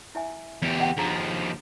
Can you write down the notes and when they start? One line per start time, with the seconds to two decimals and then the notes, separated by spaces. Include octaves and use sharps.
0.15 E4 E5 G#5
0.62 E2 G4
0.79 D#5 F#5 G5
0.97 D#2 F3 D4 G#4 A#5